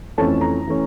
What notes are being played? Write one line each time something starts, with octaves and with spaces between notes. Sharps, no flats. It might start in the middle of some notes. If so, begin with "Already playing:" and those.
F2 E3 A3 C#4 A5
A#5
E3 A3 C#4